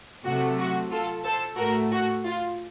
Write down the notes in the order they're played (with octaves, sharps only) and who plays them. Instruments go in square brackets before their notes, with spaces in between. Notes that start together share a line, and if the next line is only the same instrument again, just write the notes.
[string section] C3 F#3 A3 F#4
F#4
F4 A4
A4 C5
A2 A3 F#4 A#4
F#4
F4